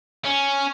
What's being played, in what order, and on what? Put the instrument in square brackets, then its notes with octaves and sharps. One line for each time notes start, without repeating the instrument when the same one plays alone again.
[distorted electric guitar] C#4